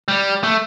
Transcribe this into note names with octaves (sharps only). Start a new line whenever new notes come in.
G3
A3